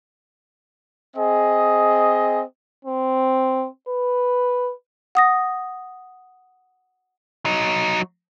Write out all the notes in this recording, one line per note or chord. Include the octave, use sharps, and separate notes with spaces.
C4 G#4 D#5
C4
B4
F#5 D#6 A#6
F#3 D#4